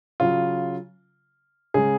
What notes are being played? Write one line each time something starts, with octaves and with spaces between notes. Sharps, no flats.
C#3 F#3 F4
C#3 G#3 G#4